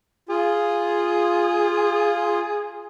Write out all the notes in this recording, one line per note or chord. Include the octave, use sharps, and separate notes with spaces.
F4 G#4